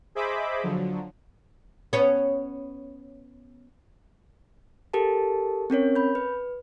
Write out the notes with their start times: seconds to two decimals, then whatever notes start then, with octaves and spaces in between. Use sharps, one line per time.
0.15 G#4 C5 D#5 E5 B5 D6
0.63 D3 F3 F#3
1.93 B3 C#4
4.94 G4 A4 A#4 A5
5.70 C4 C#4 A#4 C#5
5.95 B5 G6
6.15 B4